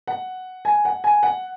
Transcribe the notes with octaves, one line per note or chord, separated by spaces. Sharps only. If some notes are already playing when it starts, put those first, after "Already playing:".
F#5
G#5
F#5
G#5
F#5